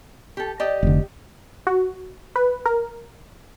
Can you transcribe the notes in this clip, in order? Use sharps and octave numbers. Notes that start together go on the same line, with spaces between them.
G4 A4
G4 D5 D#5
F1 D3
F#4
B4
A#4